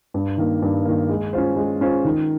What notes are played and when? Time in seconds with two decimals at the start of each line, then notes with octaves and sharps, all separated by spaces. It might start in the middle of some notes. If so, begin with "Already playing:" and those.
0.14 G2
0.38 D#3 A#3
0.62 G2
0.85 D#3 A#3
1.09 G#3
1.33 C#4 F4 C5
1.56 G#3
1.81 C#4 F4 C5
2.05 D#3